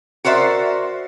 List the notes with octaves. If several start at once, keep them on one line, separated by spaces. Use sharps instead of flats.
F#4 A#4 C5 D5 E5